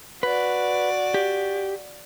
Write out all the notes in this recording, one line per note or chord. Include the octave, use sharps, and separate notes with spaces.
F#4 B4 D5
G4